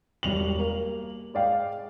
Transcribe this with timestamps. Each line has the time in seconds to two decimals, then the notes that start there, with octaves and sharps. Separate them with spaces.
0.23 E1 G3 F7 F#7
0.59 A#3
1.34 G#3 D5 F5 G5